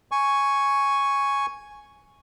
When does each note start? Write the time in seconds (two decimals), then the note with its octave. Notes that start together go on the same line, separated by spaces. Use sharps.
0.12 G#5 C#6